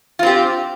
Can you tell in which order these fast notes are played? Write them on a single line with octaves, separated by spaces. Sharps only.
F4 C4 G4